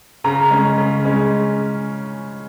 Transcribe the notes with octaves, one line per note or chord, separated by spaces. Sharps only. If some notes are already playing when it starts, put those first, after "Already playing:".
C#3 A#5
G#3 C#4
C#3
G#3 C#4